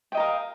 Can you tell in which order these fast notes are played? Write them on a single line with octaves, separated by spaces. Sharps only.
G5 D#5 A#4 F5